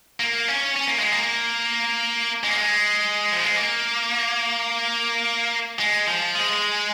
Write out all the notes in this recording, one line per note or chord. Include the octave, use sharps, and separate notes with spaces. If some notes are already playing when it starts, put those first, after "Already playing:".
A#3
C#4
C#4
A#3
G#3
A#3
G#3
A#3
G#3
F3
G#3
A#3
G#3
F3
G#3